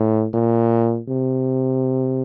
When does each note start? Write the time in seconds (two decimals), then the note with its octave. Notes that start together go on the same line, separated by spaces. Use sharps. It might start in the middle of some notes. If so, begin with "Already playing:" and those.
Already playing: A2
0.34 A#2
1.09 C3